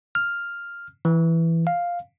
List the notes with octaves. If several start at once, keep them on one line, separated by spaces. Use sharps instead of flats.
F6
E3
F5